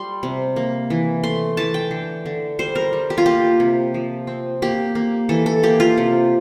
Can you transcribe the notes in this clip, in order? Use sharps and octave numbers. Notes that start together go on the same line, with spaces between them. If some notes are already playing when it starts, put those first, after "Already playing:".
Already playing: G3 C6
C3
A#3
E3
A3 C6
E3 A5
G5
D3
D3
G3 C5
A#4
G3
G4
F4
A#3 G4
C3
F3
C4
A#3 G4
A#3
E3 A4
A4
A#3 G4
F4
C3